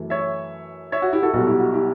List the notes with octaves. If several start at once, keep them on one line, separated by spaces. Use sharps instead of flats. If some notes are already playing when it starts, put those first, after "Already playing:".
Already playing: F#2 E3 A3
C#5 E5
C#5 E5
F#4
E4 G4
F#4 A4
B1 B2 G3 F#4 A4
E4 G4
F#4
E4 G4